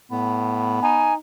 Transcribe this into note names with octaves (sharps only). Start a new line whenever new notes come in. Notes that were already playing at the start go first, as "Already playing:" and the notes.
A2 B3
D#4 G#5